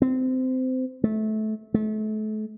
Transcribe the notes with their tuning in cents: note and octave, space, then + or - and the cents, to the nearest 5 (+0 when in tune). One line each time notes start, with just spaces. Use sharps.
C4 -20
A3 -20
A3 -35